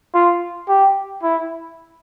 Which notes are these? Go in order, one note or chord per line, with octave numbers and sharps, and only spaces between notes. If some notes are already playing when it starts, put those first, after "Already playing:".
F4
G4
E4